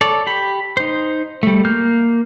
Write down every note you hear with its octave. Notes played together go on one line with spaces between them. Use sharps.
A4 C#5 D5
G4 B5
D#4 C5
G3 A3
A#3 F6 G6